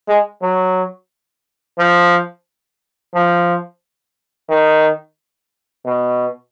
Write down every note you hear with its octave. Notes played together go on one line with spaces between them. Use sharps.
G#3
F#3
F3
F3
D#3
B2